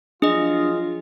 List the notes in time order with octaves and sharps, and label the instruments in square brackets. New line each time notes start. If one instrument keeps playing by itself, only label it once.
[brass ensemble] F3 F#3 F4 [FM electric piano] D4 [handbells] G#4 D#5